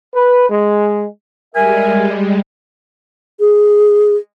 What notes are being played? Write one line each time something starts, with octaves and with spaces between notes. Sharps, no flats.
B4
G#3
G3 G#3 A#4 E5 G#5
G#4